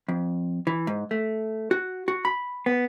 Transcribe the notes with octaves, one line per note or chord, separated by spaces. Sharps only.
F2
E3
G#2
A3
F#4
F#4
B5
B3